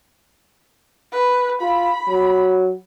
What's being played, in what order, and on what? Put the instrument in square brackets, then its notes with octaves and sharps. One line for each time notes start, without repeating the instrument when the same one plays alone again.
[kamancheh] B4
[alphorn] F4 [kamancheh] B5
[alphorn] F#3